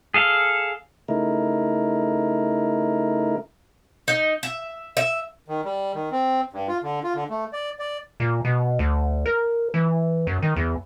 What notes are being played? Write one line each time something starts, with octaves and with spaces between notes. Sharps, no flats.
G#4 A4 F5
C#3 A3 D#4 E4 A#4
D#4
E5
E5
D#3
G3
D#3
C4
G2
F4
D3
F4
D3
A3
D5
D5
A#2
B2
D2
A#4
E3
F#2
D#3
E2